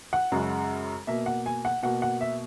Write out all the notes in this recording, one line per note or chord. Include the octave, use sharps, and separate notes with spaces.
F#5
F#2 C#3 G#3
B2 A#3 E5
F#5
G#5
F#5
B2 A#3 F#5
F#5
E5